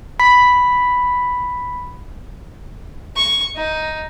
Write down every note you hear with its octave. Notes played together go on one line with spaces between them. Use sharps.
B5 B6
C#6
D#4